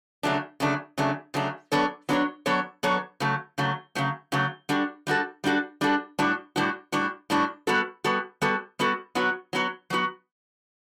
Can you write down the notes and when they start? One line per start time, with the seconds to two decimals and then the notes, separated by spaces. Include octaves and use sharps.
0.23 C#3 F#3 A3 D4
0.60 C#3 F#3 A3 D4
0.98 C#3 F#3 A3 D4
1.34 C#3 F#3 A3 D4
1.72 F#3 B3 D4 A4 C#5
2.09 F#3 B3 D4 A4 C#5
2.46 F#3 B3 D4 A4 C#5
2.83 F#3 B3 D4 A4 C#5
3.20 C#3 F#3 A3
3.58 C#3 F#3 A3
3.95 C#3 F#3 A3
4.32 C#3 F#3 A3
4.69 G3 D4 F#4 A4
5.07 G3 D4 F#4 A4
5.44 G3 D4 F#4 A4
5.81 G3 D4 F#4 A4
6.19 A2 G3 D4 F#4
6.56 A2 G3 D4 F#4
6.92 A2 G3 D4 F#4
7.30 A2 G3 D4 F#4
7.67 G3 B3 F#4 A4
8.04 G3 B3 F#4 A4
8.42 G3 B3 F#4 A4
8.79 G3 B3 F#4 A4
9.15 F#3 B3 F#4
9.53 F#3 B3 F#4
9.90 F#3 B3 F#4